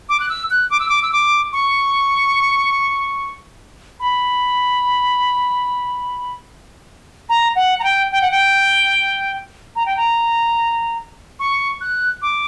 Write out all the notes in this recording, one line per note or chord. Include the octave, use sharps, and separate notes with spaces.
D6
F#6
E6
F#6
D6
E6
D6
E6
D6
C#6
B5
A#5
F#5
A#5
G5
G5
F#5
G5
A#5
G5
A#5
C#6
F#6
D6